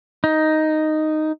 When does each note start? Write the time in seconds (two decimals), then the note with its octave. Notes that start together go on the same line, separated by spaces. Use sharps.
0.24 D#4